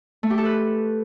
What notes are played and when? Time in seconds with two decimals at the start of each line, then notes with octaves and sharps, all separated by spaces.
0.23 A3
0.30 G4
0.38 A4
0.45 B4